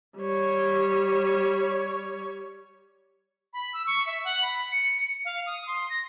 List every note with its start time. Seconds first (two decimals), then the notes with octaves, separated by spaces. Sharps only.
0.18 G3 C#5
3.53 B5
3.73 E6
3.87 C#6
4.07 E5
4.24 F#5
4.42 B5
4.72 C#7
5.25 F5
5.46 D#6
5.67 C6
5.90 A#6